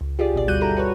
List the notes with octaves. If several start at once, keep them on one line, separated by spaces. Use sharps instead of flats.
C#2
F4 G4 G#4 D5
G#1 B2 D5
D2 G3 F#4 F#6 G6 D#7
G2 E4 G4 A4 A#5
F#4 B4 C#5